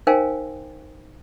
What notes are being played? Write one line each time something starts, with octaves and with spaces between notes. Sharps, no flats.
D#4 A#4 C5 F5 G5 G#5